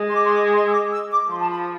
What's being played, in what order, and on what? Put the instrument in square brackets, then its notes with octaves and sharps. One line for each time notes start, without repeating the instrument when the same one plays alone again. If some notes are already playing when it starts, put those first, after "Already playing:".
Already playing: [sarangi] G#3
[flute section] C6
D6
C6
D6
C6
E6
D6
E6
D6
[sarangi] F3 [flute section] C6
[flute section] A5
B5